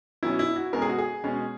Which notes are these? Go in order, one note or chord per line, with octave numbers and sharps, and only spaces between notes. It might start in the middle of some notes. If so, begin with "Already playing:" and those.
B2 F#3 C#4 E4
E4
F#4
B2 G#3 C#4 A#4
G#4
F#4
G#4
B2 G#3 C#4